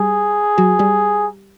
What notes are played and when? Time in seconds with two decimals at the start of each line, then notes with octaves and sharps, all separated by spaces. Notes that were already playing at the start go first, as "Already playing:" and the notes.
Already playing: G3 G4 G#4
0.58 F#3 F#4
0.79 G3 G4